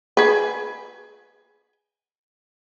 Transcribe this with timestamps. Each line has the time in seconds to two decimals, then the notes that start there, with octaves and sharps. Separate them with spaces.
0.17 G#4 B4